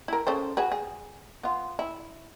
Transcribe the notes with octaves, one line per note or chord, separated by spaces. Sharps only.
E4 A#4
C#3 A4 C5
F#4 G#4 B4
G#4
B3 F4
E4